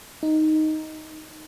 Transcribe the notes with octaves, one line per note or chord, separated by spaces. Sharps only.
D#4